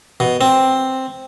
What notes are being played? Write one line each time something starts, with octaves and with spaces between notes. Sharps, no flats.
B2
C4